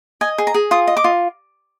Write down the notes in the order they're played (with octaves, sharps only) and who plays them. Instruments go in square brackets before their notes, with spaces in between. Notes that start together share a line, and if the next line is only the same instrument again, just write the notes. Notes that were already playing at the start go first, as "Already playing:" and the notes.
[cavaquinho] D#5 G#5
G#4
A#5
G#4
F4 D#6
D#5
D6
F4